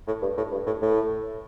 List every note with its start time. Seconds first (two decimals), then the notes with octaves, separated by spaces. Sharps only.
0.07 A2
0.22 G2
0.37 A2
0.52 G2
0.67 A2
0.82 A2